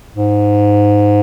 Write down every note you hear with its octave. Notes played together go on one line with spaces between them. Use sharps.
G#2